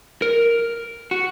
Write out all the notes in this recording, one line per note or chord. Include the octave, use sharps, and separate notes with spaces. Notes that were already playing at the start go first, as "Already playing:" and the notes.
A#4
F#4